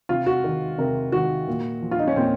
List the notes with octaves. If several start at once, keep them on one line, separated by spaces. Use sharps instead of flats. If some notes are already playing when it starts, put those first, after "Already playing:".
C3 F4
F#4
D#3
C3 A#4
D#3 F#4
A#2
F3
F4
D#4
C#4
A#2 C4